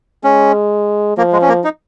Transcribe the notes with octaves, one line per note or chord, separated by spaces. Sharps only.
G#3 C#4
F3 A#3
G#3
C#4
A#3
D#4